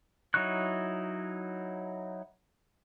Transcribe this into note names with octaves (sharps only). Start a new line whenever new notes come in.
F#3 D#4 E4 C#6 F#6